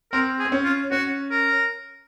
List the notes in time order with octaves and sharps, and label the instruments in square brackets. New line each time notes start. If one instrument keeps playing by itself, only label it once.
[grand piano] C4 [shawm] A#4
[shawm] G#4
[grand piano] C4
C#4
[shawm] F4
[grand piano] C#4 [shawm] F#4
[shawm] A#4